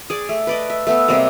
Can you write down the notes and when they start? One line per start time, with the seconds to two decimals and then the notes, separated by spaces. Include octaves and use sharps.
0.10 G#4 D5
0.29 A3
0.47 B4 D5 D#5
0.70 E5
0.87 A3 B3 A4
1.08 C3 G3 G#3 A#3